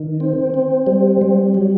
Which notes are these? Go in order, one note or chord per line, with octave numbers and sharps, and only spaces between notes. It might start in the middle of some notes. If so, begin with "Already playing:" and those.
Already playing: D#3
C4
C4
G3
G3
F#3